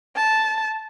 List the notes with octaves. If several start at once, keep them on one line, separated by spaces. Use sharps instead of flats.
A5